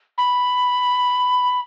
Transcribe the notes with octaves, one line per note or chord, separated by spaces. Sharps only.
B5